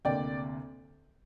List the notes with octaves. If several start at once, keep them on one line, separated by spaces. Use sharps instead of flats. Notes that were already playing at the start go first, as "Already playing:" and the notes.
D2 C3 A#3 D5 G5